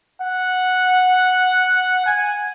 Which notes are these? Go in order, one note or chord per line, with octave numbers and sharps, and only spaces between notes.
F#5
G#5